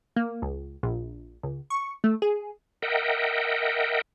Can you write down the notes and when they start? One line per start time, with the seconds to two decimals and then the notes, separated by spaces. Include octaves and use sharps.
0.16 A#3
0.42 C#2
0.83 A#1
1.43 C#2
1.70 C#6
2.04 A3
2.22 G#4
2.82 A#4 D#5 E5 F#5 G5